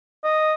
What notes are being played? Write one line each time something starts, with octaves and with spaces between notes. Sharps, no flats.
D#5